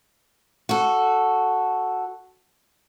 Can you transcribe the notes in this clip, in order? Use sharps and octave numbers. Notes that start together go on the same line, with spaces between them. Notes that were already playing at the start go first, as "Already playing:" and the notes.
F#4 A4